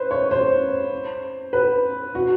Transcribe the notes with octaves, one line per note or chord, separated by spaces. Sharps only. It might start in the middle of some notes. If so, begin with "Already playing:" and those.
Already playing: B4 C5
C#5
C5
B4
F#4